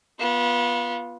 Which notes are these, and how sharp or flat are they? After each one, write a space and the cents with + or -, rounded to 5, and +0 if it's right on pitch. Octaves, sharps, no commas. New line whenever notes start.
B3 -25 F4 +0